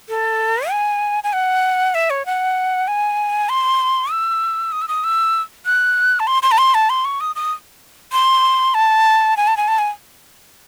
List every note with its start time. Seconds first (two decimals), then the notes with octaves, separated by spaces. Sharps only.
0.09 A4
0.70 G#5
1.24 G#5
1.33 F#5
1.95 E5
2.10 C#5
2.26 F#5
2.88 G#5
3.49 C6
4.11 E6
4.72 D#6
4.82 E6
4.88 D#6
5.04 E6
5.66 F#6
6.20 A5
6.27 C6
6.43 C6
6.51 A5
6.58 C6
6.74 A5
6.90 C6
7.05 C#6
7.21 D#6
7.36 D#6
8.13 C6
8.74 A5
9.37 G#5
9.47 A5
9.57 G#5
9.68 A5
9.79 G#5